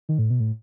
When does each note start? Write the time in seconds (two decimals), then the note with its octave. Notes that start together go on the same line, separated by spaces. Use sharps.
0.09 D#3
0.19 A2
0.30 B2
0.40 A2